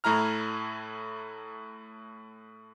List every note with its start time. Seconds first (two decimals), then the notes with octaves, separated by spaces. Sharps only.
0.04 A2 A3 E4 A#5 F6